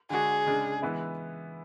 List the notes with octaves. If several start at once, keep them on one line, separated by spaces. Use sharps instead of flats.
D3 G#3 D4 F#4 G#4
C#3 G#3 D4
E3 G#3 B3 E4